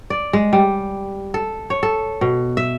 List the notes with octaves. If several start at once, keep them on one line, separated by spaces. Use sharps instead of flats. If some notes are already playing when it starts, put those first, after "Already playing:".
D5
G#3
G3
A4
C#5
A4
B2
E5